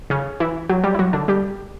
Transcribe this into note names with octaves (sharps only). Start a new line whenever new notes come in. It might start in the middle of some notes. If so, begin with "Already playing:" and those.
C#3 C#4
E3 E4
F#3 F#4
G3 G4
E4
F#3 F#4
D3 D4
G3 G4